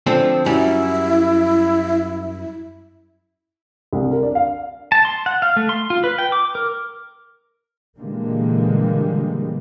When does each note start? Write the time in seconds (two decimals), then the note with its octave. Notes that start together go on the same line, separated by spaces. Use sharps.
0.06 D3 F3 C4
0.46 F#2 G3 E4
3.93 C2
4.11 A#4
4.23 D4
4.35 F5
4.92 A5
5.05 C6
5.26 F#5
5.42 F5
5.56 A3
5.69 C6
5.90 F4
6.04 B4
6.18 G5
6.32 D6
6.55 A#4
7.98 A#2 D3 E3 G3 G#3 A#3